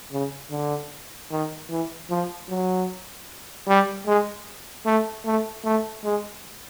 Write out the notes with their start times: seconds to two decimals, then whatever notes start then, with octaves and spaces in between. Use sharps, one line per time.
0.12 C#3
0.51 D3
1.31 D#3
1.69 E3
2.10 F3
2.49 F#3
3.67 G3
4.06 G#3
4.86 A3
5.25 A3
5.64 A3
6.04 G#3